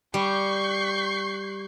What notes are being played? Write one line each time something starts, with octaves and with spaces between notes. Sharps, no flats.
G3 C#6 G6 C7